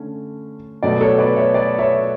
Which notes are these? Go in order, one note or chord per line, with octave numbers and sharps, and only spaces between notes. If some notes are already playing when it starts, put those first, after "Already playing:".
Already playing: D3 A3 C#4
B2 F#3 A3 B4 D5
A4 C#5
B4 D5
C#5 E5
B4 D5
C#5 E5